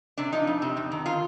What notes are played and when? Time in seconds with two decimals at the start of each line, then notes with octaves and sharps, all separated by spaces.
0.18 C3 D4
0.33 F3 D#4
0.47 F2
0.62 C3
0.77 F2
0.92 D#3
1.06 D#3 F4